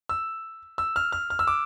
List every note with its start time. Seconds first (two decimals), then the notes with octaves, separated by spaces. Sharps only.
0.09 E6
0.78 E6
0.96 F6
1.12 F6
1.30 F6
1.39 E6
1.47 D6